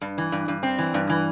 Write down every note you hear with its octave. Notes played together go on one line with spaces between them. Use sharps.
G2
E3
G2
G2
C4
E3
G2
E3